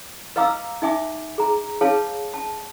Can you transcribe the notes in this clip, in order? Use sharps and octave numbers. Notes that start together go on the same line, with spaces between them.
B4 D#5 F5 A#5 D6 E6
D#4 E5 G#5 D6
G#4 A#5
G#4 B4 C#5 F5 A5
A5